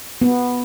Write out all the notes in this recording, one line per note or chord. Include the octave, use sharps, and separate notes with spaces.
B3